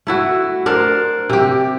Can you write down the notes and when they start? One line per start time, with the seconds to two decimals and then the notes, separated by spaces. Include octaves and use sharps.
0.07 A3 E4 F#4
0.66 D4 A#4 C5
1.29 C3 G4